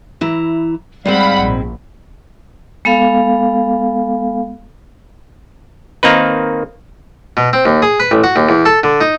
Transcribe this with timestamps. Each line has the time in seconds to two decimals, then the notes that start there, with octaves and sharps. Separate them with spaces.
0.21 E3 E4 A#5
1.06 G#2 G3 G#3 C4 F5 F#5 B5
1.39 A#1
2.85 G#3 B3 A4 F5
6.03 D#3 A#3 C4 D#4 B4
7.37 B2
7.53 C4
7.65 D#2
7.82 G#4
8.00 B4
8.11 A1
8.24 F#4
8.36 D#2
8.49 E2
8.65 A4
8.83 D3
9.01 D#4